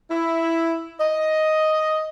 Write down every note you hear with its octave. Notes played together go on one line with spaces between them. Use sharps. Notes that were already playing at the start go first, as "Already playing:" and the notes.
E4
D#5